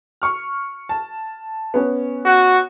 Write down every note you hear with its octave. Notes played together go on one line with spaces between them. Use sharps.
C#6 F6
A5
B3 C#4
F#4